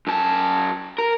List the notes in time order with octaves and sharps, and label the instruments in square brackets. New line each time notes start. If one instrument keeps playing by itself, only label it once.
[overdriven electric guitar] F#2 A5
A#4